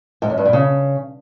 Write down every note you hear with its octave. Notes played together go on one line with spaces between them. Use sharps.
G#2
F#2
G2
A#2
C#3